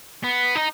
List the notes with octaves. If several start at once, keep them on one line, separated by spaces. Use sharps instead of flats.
B3
D#4